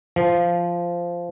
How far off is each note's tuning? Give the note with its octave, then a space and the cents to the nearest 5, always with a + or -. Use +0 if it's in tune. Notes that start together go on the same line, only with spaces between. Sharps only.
F3 -10